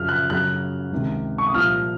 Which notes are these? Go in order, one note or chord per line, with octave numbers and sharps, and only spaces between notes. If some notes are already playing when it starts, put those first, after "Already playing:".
Already playing: F#2 C#3 F3 F6
F#6
F#2 C#3 F#3 F#6
C#2 C3 D#3
C#6
D#6
C2 A#2 F3 F6